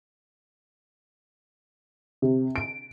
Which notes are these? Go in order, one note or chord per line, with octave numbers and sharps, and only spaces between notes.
C3
D7